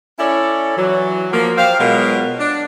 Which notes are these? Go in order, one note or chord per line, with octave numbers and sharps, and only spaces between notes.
C#4 E4 A4 C#5 D5
E3 F#3
F3 A#3
G4 C5 F5
B2 F#3 G#3 F4 A#4
D4